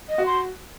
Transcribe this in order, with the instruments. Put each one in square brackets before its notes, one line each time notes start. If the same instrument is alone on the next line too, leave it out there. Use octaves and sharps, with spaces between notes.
[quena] D#5
[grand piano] F#4
[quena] C6